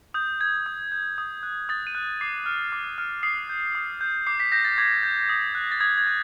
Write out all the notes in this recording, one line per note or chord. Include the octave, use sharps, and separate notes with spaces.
D#6 G6
G6 G#6
D#6
G6
D#6
F#6
D#6 A6
D#7
F#6
D6 C7
F6
D6
F6
D#6 C7
G6
D#6
G6
D6 C7
B6
G6 A#6
A6
D6 G#6
G6
D#6
F#6
A6
D#6 G#6
G#6
F#6